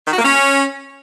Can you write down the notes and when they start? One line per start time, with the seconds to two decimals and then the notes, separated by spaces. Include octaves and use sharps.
0.07 D#3
0.13 F#4
0.19 A#3
0.24 C#4